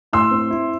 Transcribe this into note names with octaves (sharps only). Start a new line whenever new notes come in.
A2 C6 E6
C4
E4